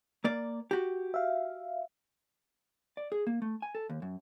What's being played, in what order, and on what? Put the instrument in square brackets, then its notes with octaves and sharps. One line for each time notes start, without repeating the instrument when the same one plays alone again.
[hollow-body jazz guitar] A#3 D5
F#4 G4
[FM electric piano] E5 F5
[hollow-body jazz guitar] D5
G#4
A#3
A3
G#5
A4
D#2
F#2